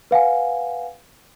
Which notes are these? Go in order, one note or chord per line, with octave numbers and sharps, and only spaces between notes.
B4 F5 F#5 G#5